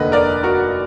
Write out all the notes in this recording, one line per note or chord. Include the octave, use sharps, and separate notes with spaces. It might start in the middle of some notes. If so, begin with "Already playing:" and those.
Already playing: F1 D#2 D3 B4 D#5
A#4 D5
F#4 A#4